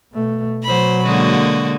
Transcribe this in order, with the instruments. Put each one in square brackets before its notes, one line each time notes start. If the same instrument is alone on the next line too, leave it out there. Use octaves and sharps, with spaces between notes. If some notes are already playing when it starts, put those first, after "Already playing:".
[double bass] B2 A3
[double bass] B2 F#3 [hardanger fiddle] C5 B5
[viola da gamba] D3 G#3 A#3 [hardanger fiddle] F#4